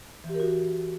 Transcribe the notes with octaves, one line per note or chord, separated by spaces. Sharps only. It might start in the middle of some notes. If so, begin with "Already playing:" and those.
E3
G4
A#4
F#4